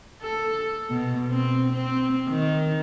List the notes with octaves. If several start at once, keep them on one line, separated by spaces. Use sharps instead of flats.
A4
B2
C4
C4
D#3